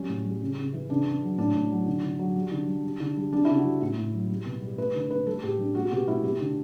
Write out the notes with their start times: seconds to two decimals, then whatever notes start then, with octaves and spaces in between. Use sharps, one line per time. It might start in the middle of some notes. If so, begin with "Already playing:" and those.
Already playing: F#3 G3 C#4
0.09 A2
0.25 G3
0.41 C#3
0.58 C#3
0.73 E3
0.90 C#3 D4
1.06 C#3
1.23 F#3
1.38 A2 D4
1.54 A2
1.71 F#3
1.86 D3
2.03 D3
2.19 F#3
2.36 G3
2.52 D3
2.68 G3
2.84 G3
3.00 D3
3.17 G3
3.32 G3 D4
3.45 C#3 E4
3.57 F#4
3.65 G3
3.81 A2 E4
3.98 A2
4.13 F#3
4.30 G3
4.46 B2
4.61 G3
4.78 A3 B4
4.94 D3
5.10 A3 B4
5.26 G3 A4
5.43 A2 G4
5.59 G3 D4
5.75 A3 F#4
5.85 F#4
5.91 B2 G4
6.08 A3 E4
6.23 A3 G4
6.40 D3